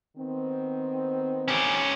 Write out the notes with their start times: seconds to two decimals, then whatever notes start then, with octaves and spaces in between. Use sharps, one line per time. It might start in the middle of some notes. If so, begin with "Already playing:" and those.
0.16 D#3 B3 C4
1.48 C#4 G4